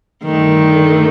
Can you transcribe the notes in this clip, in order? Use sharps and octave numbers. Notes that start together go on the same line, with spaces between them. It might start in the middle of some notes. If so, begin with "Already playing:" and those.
G2 D3 D#3 A3